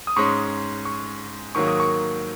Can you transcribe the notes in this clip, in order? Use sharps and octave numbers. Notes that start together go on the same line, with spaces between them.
D#6
G#2 G#3 C#4 C#6
C#6
G#2 D#3 F#3 A#3 C#6
D#6
C#6